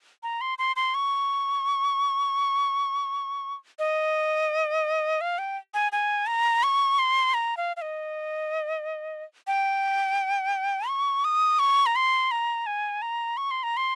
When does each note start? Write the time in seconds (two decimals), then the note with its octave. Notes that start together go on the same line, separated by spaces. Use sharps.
0.23 A#5
0.41 C6
0.58 C6
0.76 C6
0.95 C#6
3.79 D#5
5.21 F5
5.38 G5
5.74 G#5
5.92 G#5
6.27 A#5
6.63 C#6
6.99 C6
7.34 A#5
7.57 F5
7.77 F5
7.82 D#5
9.47 G5
10.89 C#6
11.25 D#6
11.59 C#6
11.86 A#5
11.96 C6
12.31 A#5
12.66 G#5
13.02 A#5
13.37 C#6
13.51 C6
13.63 A#5
13.77 C6